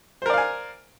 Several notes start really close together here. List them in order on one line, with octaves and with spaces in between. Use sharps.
C5 A#4 D5 F5 G#5